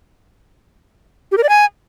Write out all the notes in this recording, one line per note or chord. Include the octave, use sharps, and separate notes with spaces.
G4
A#4
D5
G#5